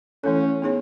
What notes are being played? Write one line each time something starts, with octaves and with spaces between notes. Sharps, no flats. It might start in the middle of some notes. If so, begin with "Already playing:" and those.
E3 A3 C#4 E4 A4
B3 D#4 G#4 C#5